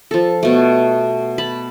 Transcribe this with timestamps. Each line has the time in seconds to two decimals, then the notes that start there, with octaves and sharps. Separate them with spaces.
0.11 F3 A4
0.43 B2 A3
1.38 A5 B5